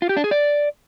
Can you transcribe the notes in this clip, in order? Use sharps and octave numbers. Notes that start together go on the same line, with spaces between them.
F4
G4
D4
G#4
D5